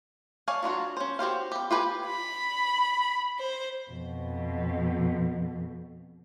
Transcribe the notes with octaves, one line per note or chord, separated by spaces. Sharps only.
C#5 D5 F5 G#5 A5
F#3 D4 F4 F#4
C#4 C5
F#4 G4 C5 F5
B3 G4
F4 G4 B4 G#5
B5
C5
F2 B2